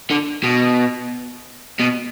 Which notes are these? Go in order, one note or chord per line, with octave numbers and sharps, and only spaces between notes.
D3
B2
B2